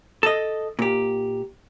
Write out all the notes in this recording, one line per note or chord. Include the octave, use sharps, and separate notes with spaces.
A4 D#5
A#2 G4